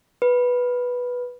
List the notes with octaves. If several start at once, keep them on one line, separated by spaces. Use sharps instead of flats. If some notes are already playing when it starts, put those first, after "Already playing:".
B4